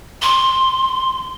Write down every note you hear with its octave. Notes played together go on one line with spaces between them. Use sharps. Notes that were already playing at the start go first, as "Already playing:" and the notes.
C6